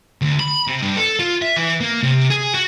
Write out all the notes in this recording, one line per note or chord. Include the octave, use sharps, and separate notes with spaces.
D2
B5
C3
G2
A4
F4
E5
E3
A#3
C3
G#4
F#4